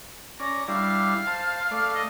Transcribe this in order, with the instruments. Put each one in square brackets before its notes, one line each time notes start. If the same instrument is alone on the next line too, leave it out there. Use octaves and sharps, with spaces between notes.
[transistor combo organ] C#4 D5 [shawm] A#5
[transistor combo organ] G3 D4 E4 [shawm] F5
[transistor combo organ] C5 A5
A3 D5
[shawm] D#5